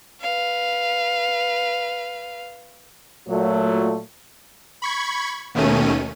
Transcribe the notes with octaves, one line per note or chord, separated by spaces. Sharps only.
B4 F5
A#2 F#3 A3
B5 C#6 G#6
D#2 B2 D#3 A3 C#4 D#7